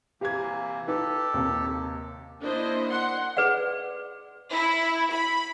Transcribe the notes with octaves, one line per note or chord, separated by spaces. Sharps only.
C3 E3 A#3 G4 G#6
D#4 G4 A4 B4
D#2 C3 A#3
A#3 D4 E4 C5 D#5
F#5 C6
G#4 B4 D5 F#5
E4
B5